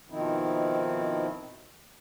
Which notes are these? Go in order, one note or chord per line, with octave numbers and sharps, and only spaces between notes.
B2 D#3 F3 C4 D#4 E4